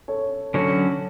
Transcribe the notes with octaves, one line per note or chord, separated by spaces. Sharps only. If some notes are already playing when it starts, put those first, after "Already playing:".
A4 C#5
D3 F#3 C#4 F#4 A4 C#5